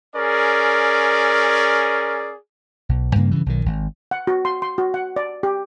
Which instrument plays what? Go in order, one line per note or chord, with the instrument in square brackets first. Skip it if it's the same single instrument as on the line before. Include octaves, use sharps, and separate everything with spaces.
[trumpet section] C#4 G#4 A#4 D5
[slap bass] B1
G2 C#3 A#3
G2 C#3 E3
B1 D#3
G#1
[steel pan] F#5
F#4
C6
C6
F#4
F#5
D5
G4